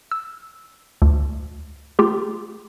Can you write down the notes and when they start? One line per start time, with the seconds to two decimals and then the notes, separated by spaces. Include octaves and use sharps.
0.11 E6
1.02 D2 A3
1.99 A3 F4 G4 G#4